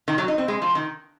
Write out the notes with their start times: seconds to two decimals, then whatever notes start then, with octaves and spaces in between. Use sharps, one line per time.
0.08 D#3
0.18 F#3
0.28 D#4
0.38 C4
0.48 G#3
0.62 F3
0.75 D#3